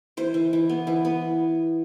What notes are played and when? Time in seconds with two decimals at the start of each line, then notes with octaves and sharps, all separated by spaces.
0.17 E3 C5
0.34 E3
0.53 E3
0.69 B3
0.87 E3
1.05 B3